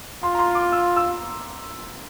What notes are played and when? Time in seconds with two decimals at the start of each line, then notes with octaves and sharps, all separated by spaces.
0.23 F4 C6
0.35 A#5
0.39 C6
0.55 D6
0.72 E6
0.96 E6